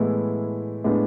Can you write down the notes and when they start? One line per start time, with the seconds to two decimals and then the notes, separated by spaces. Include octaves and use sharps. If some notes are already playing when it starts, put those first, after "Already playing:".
Already playing: A2 E3 G#3 B3 E4
0.84 A2 G#3 B3 D4